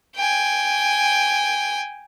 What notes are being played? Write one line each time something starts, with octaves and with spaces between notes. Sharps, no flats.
G5 G#5